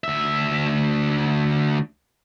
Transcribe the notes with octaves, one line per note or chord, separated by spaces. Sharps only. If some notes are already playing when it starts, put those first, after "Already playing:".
D2 E5